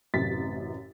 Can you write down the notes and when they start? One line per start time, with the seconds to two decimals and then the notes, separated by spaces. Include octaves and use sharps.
0.14 A1 F#2 C3 A6 B6